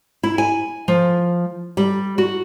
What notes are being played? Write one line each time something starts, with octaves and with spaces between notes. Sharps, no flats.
E4
G#5
F3
G3
F#4